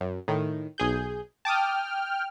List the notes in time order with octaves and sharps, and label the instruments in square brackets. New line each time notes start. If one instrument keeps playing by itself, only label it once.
[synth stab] F#2
A2 D#3
B1 G#4 G6
[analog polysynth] G5 F6 [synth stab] A5 D6 D#6